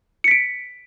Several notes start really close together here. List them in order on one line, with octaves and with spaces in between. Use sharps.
C#7 B6 D7